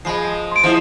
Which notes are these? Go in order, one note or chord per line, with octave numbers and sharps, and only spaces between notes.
F3 G#3 D#5 B5 C7
C6 D7
F3 E4 C5 D#5 E5 D#6